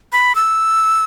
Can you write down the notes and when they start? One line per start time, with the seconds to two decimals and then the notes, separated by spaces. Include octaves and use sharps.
0.12 B5
0.35 E6